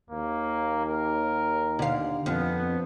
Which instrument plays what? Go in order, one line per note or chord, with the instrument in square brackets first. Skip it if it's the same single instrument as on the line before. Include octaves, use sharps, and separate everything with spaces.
[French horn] D#2 [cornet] A#3
[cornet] A#4
[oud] D3 F5
[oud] F2 [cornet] B3